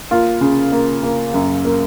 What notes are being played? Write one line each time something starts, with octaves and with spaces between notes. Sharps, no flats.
A#3 F4
C#3
A#3
A#3
F#2
A#3